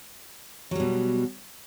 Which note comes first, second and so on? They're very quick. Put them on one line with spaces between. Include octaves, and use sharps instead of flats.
F#3 G3 B2